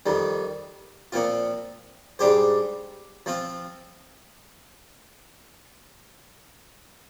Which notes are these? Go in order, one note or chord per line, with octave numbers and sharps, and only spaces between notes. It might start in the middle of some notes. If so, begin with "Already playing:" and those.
F2 D#3 G3
A#2 F3 C4 F4
G#2 G3 D4 G4 C5
F3 C4 F4